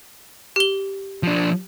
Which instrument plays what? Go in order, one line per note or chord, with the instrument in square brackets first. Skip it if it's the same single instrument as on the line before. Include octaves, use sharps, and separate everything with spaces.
[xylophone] G4 G7
[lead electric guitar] F3 D4